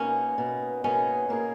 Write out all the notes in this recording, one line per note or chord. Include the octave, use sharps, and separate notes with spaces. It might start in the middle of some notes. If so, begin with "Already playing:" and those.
Already playing: B2 A#3 C#4 D#4
B2 A#3 D#4
B2 A#3 C#4 D#4 G#4
B2 A#3 D#4 G#4